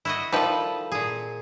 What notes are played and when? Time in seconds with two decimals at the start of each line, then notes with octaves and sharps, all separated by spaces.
0.05 E4 F#4 D#5
0.32 D#3 F3 G3 A4 B4
0.92 A#2 G#4